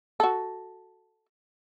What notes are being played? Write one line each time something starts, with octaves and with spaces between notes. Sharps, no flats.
F#4 A4